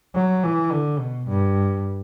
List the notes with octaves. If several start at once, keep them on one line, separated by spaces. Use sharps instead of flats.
F#3
E3
D3
B2
G2